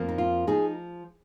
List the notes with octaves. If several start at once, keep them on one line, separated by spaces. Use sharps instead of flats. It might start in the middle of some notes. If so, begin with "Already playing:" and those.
Already playing: F2 F3 A#3
D#4
F4
F3 D#4 G#4